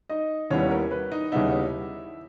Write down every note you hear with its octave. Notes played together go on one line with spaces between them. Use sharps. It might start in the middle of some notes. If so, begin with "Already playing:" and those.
D#4 D#5
D#2 D#3 G3 B3 C#4 E4 C#5
A#4
B4
D#4 D#5
D#2 C#3 G3 B3 D#4 E4 E5